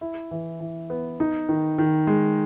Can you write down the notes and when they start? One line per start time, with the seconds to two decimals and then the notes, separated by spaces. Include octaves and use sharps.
0.01 E4
0.31 E3
0.60 E3
0.90 B3
1.20 D#4
1.49 D#3
1.78 D#3
2.07 G#3